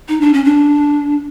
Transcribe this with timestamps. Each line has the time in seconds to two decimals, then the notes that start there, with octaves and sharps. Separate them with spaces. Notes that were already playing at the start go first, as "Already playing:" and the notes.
0.09 D#4
0.21 D4
0.33 C#4
0.45 D4